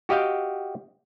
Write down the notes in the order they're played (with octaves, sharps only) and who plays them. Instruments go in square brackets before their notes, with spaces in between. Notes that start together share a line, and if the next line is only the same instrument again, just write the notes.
[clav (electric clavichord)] F#4 G4 D#5 F5 G5